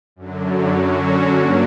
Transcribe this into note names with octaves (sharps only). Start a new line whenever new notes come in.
F#2 D3 F#3
D3 F#3 C#4 F#4
G2 D3 A#3 D4